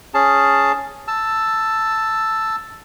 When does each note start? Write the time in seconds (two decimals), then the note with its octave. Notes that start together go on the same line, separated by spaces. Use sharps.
0.14 C#4 G#4 A5
1.08 A5 E6